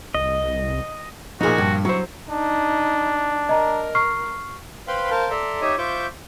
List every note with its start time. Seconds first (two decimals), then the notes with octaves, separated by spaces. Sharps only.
0.14 C2 D#5
1.41 A#2 F3 D#4 F#4 G#4
1.58 G2
1.85 F#3 E4 C5 C#6
2.29 D4 D#4
3.49 A#4 D#5 A#5
3.95 C#6 F6 C7
4.88 B4 C5 F5 G5 B5 C6
5.11 A#4 C5 F5 A5
5.30 A4 D5 E5 A#5 C6
5.61 D#4 G4 C#5 D#5 E5
5.78 F4 C5 E5 C#6 D6 G6